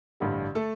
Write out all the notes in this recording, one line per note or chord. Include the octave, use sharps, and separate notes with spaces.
A1 G2 D3 G3
A3 A4